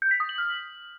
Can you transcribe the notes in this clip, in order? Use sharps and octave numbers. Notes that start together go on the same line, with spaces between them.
G6
B6
D#6
F#7
F6